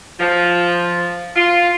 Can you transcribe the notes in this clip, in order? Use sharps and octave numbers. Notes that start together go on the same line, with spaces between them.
F3
F4